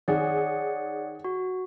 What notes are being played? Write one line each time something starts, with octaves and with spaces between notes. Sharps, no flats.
D#3 G#4 C#5 D5 F#5
F#4